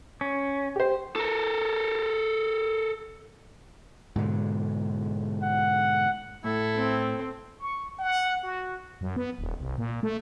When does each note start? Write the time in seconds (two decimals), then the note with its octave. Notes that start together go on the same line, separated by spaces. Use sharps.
0.21 C#4
0.76 G4 C5
1.16 A4 A#4
4.16 G#2 B2 D3
5.43 F#5
6.44 A2 E4 A4
6.75 C4
7.60 C#6
7.99 F#5
8.43 F#4
9.01 F#2
9.16 B3
9.39 D#1
9.60 C2
9.78 A#2
10.03 A3